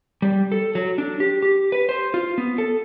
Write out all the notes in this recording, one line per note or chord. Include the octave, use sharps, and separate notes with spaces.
G3
A4
F#3
D4
G4
G4
B4
C5
F4
B3
A4